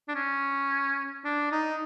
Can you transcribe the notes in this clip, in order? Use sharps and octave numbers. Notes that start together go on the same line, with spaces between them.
D4
C#4
D4
D#4